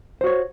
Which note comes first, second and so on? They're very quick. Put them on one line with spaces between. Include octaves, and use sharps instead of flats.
C5 F#4 C#5